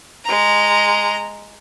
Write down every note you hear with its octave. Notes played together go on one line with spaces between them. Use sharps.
G#3 A#5